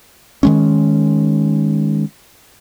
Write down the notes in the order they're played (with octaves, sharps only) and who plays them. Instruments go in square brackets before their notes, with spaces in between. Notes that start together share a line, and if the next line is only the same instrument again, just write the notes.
[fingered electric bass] D#3 G#3 C#4